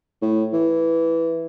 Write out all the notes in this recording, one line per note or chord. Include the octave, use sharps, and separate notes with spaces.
A2
E3